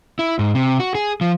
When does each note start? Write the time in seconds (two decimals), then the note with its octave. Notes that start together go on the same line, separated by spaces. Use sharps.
0.19 E4
0.39 G#2
0.55 C3
0.80 F#4
0.95 G#4
1.21 F3